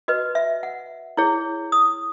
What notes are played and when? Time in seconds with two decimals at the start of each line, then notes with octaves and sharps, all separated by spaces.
0.08 F#4 B4 D#5
0.35 E5
0.63 F#5
1.17 E4 G#4 C#5
1.72 D#6